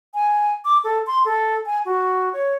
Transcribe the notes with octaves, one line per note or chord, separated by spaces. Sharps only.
G#5
D6
A4
C6
A4
G#5
F#4
C#5